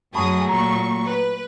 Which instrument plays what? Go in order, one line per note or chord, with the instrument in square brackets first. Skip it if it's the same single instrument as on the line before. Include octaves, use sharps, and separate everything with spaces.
[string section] F#2 G#4 D#6 [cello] F#3 A3 [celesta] A5 B5 C#6
[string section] A#2 C#6 [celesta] A#5
[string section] B4